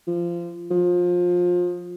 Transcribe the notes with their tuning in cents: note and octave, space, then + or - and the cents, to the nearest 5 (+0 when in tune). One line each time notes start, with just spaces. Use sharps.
F3 -20
F3 +25